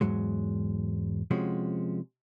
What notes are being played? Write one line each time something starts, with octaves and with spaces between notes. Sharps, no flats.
E2 G#2 F#3 G#3
C3 F3 G#3 C#4 F#4